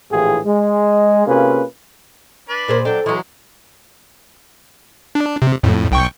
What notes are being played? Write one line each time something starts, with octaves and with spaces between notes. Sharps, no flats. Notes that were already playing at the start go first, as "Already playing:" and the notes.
A#1 A2 E3 F4 G4 G#4
G#3
C3 A#3 C#4 F4 G#4 B4
D4 B4
A#2 G#4 A#4 C5
F#3 D4 A4 G5
E3 F#3 G#3 C#4
D4
C3
F2 A2
B1 G5 C#6